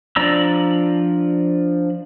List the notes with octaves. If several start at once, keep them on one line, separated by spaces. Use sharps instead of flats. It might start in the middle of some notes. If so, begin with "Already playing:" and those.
F3 D4 D5 A#5 E6